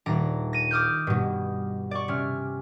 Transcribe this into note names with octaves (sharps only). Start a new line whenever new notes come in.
D#1 D4 A#5
A#6 D#7
D6 D#6 F6 G6
G2 B2
D5 C#6
C3 C#4 F6